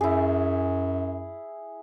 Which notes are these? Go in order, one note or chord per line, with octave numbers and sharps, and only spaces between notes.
F#2 E4 G#4